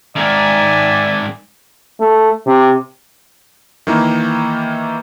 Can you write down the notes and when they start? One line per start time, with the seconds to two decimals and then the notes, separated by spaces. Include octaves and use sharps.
0.16 G#2 D#3 D5 E5 G#5
2.00 A3
2.46 C3
3.87 D#3 E3 A#3 D#4